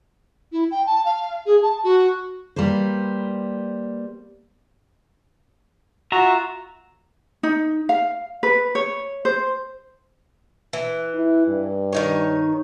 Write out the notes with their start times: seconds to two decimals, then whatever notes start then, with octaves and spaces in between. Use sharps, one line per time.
0.52 E4
0.71 G5
0.86 A5
1.05 F5
1.46 G#4
1.62 A5
1.84 F#4
2.56 G3 A#3 B4 C5
6.12 F4 F#4 E5 A#5
7.43 D#4
7.89 F5
8.43 B4
8.75 C#5
9.25 C5
10.73 E3
11.14 E4
11.47 G2
11.93 D#3 D#4 C#5